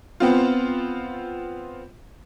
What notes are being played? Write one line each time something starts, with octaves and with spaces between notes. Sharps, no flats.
B3 C4 F4